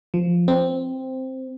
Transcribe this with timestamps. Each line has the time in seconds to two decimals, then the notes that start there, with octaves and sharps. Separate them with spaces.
0.14 F3
0.48 C4